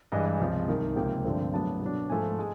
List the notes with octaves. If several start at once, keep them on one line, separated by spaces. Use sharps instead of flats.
G2 E3 G#3 D#5
D#5
C#2 C3 F3
C2 C3 D#3
C#2 C3 F3 A#3 G5
G2 D3 F3 A3 C4
A2 F#3 B3 D4 A5
B2 F#3 B3 D4
G#2 F3 A3 G#5
G#3